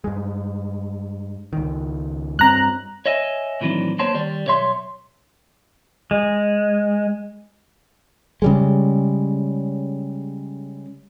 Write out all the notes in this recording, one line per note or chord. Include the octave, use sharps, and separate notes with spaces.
G2 G#3
C#2 D#3
G2 C4 A#5 F#6
C#5 D#5 E5 G#5
A2 D#3 E3 F#3 C4 D4
A#3 B3 C5 C#5 A5
D#3 G3 D5
B1 C#5 E5 C6
G#3
C#3 G3 G#3